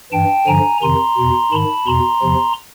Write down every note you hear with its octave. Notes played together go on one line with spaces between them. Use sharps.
G2 E3 G5 A5
G2 D3 F3 G#5 A#5
F2 C3 D#3 A#5 C6
E2 B2
G#2 D#3 A5 B5
E2 B2 A#5 C6
E2 C3 F3